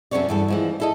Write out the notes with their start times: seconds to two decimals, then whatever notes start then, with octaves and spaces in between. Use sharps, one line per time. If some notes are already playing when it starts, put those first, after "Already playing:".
0.11 F#2 C3 C#4 A4 C#5 D5
0.28 E2 G2 A4
0.48 E3 F3 G#3
0.80 E4 A4 D#5